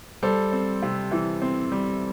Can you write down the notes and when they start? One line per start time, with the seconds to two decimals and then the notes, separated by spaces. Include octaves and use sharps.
0.23 G3 A4 C5
0.52 C4
0.82 C3
1.11 E3
1.42 C4
1.72 G3